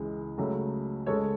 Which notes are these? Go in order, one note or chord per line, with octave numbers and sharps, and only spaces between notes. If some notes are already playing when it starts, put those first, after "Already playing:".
Already playing: C#2 C#3 E3 G#3
C#2 C#3 F#3 A3
C#2 C#3 G#3 A4 C#5